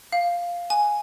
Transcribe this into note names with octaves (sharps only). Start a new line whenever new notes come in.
F5
G#5